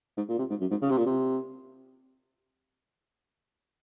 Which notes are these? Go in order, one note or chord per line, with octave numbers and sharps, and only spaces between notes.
G#2
A#2
C3
G#2
F#2
G#2
C#3
C3
A#2
C3